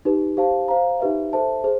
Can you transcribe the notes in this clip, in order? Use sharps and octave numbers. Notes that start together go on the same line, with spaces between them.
D#4 G4 B4
G4 C5 F5 A5
C5 F5 A#5
D#4 G4 B4 E5
A4 C5 E5 A5
G#4 C5